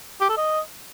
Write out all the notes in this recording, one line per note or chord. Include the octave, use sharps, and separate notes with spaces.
G4
A4
D#5